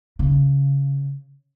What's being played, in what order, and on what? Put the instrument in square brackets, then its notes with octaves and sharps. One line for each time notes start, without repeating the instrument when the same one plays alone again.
[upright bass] C#3